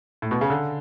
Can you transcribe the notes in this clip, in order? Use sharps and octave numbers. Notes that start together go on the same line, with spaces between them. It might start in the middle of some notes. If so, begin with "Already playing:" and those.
A2
B2
C#3
D3